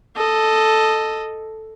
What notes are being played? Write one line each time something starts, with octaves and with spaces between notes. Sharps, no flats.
A4 D#5